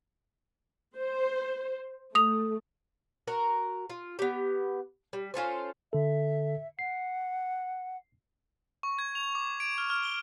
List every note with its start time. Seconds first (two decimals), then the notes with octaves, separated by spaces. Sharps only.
0.97 C5
2.15 A3 D#6 F7
3.27 F#4 A#4 A#5
3.90 F4
4.19 B3 G4
5.13 G3
5.34 C#4 F4 A4 C5
5.93 D3 A4 E5
6.79 F#5 C7
8.83 C#6
8.99 G#6
9.15 F7
9.35 D6
9.60 D7
9.78 F6
9.90 F6
10.03 G7